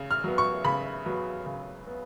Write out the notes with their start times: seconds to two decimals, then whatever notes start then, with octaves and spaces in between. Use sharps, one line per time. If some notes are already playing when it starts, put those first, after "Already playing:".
Already playing: C#3
0.11 F6
0.24 F#3 B3
0.38 C#6
0.64 C#3 B5
1.06 F#3 B3
1.46 C#3
1.87 B3